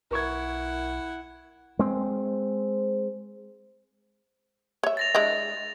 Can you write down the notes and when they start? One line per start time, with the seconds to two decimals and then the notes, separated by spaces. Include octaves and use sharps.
0.11 B1 E4 A#4 F#5 C#6 G#6
1.79 G#3 C4
4.83 C#5 E5
4.97 A6 A#6 F7
5.15 G#3 D4 E4